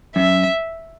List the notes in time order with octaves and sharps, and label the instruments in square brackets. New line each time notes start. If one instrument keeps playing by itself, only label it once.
[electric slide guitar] F#2 [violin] E5